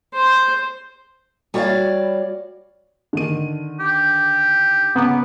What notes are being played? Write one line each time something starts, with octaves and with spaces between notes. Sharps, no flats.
C5
G3 F#4 C#5 D5 F5
D3 D#3 D#7
G4
C#3 B3 A#5 D6